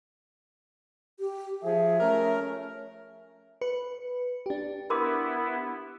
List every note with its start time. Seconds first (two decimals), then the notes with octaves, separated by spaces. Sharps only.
1.19 G4
1.63 F3 G#4 E5
1.99 A3 C#4 A#4
3.61 B4 C#7
4.46 D4 G4
4.90 B3 E4 A#4 C6 D6